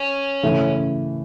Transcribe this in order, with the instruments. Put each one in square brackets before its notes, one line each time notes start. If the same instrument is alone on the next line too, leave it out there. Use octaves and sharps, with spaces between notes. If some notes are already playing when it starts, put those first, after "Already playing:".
Already playing: [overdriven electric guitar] C#4
[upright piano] C#3 E3 A3